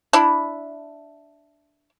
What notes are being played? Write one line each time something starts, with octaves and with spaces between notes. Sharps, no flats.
D4 E4